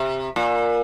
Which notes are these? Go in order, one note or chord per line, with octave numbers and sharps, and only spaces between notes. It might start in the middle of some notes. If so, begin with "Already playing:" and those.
Already playing: C3
A#2